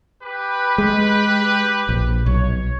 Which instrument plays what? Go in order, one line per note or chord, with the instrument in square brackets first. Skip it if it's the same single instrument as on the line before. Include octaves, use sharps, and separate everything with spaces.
[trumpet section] G4 B4
[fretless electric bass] G#3
A#1
[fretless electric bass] B1 [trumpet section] C#5